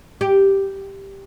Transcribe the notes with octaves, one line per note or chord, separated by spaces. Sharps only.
G4